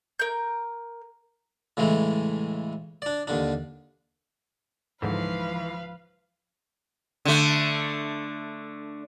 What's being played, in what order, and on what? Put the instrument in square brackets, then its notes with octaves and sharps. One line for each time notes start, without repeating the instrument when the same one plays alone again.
[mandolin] A#4 G6
[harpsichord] A2 C#3 E3 G#3 A3
D4 D5
D#2 D3 D4
[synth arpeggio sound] C#2 G#2 D3 [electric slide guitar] E3 [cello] F3 [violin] B4 F5
[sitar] D3 A3